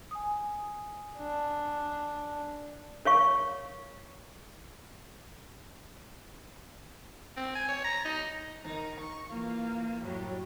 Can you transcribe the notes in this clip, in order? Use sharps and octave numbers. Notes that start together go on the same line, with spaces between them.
G#5 D#6
D4
A#4 C#5 F5 C#6
C4
G#5
C#5
A#5
D#4
D#3 D#4
C#6
E3 A#3 F4
F#2 A2 F#3 G3